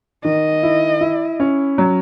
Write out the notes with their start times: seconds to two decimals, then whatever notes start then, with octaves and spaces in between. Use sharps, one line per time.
0.24 D#3 D#5
0.63 E4
1.01 E4
1.40 C#4
1.78 F#3